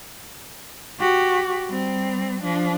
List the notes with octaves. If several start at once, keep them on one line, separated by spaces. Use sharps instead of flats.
F#4 G4
G3 C4
F3 D4